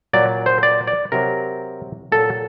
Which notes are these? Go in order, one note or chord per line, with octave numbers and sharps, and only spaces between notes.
A#2 F#3 D5
C5
D5
D5
C3 F#3 A#4
A#2 F#3 A4